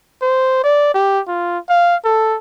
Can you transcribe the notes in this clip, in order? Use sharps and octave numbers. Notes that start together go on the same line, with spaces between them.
C5
D5
G4
F4
F5
A4